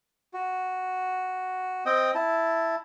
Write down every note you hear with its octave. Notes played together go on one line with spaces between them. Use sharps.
F#4
C4 D#5 G5
E4 A5